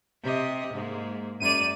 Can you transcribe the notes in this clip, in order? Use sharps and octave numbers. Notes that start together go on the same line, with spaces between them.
C3 G4 D#5
G#2 G#3 A#3
F#2 G#3 D5 D#7